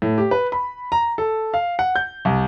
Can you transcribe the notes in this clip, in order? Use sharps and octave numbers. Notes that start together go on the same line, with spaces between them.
A2
G4
B4
B5
A#5
A4
F5
F#5
G6
C2